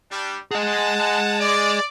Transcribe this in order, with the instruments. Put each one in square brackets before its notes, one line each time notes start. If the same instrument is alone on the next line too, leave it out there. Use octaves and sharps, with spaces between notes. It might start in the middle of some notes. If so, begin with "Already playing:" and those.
[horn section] G3 D4
[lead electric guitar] G#4 D#5 [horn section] F#5 A5
[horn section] D5